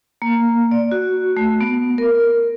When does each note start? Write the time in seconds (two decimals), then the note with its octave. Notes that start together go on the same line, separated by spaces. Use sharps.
0.22 A#3
0.71 D5
0.91 F#4
1.37 A3
1.61 B3
1.98 A#4